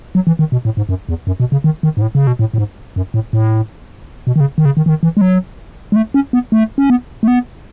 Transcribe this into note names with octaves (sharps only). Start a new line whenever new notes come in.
F#3
E3
D#3
B2
A2
G#2
F#2
E2
F#2
B2
C#3
D#3
D#3
G#2
A2
C#3
B2
A2
A2
G#2
F#2
A2
A2
B2
D#3
C#3
D#3
C#3
D#3
E3
D#3
E3
G#3
F#3
G#3
A3
C#4
B3
A3
C#4
B3
A3
B3